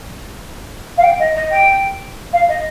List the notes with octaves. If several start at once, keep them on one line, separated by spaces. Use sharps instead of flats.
F5
G5
D#5
D#5
G5
F5
D#5